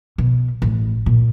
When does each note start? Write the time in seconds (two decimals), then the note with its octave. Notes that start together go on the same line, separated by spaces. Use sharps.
0.18 B2
0.62 A1
1.06 A#2